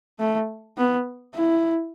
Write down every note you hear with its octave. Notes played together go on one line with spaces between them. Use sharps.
A3
B3
E4